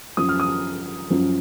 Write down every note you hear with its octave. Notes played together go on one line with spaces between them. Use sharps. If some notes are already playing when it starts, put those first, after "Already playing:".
F#2 F3 D#6
F6
D#6
F#2 F3